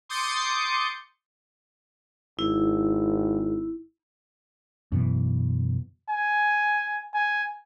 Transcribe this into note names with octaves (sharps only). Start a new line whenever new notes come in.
C6 D6 D#6 G6 A6 C#7
G#1 E4
F#2 B2 E3
G#5
G#5